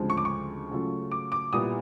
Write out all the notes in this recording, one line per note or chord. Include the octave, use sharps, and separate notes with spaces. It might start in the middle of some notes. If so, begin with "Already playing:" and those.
Already playing: D2 C#3 F3 G#3 C4
C#6
D6
C#6
C#3 F#3 A3 C#4 F4
D6
D6
A#2 G3 B3 E4 D#6